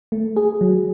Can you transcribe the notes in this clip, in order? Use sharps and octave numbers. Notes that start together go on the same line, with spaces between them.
A3
G#4
F#3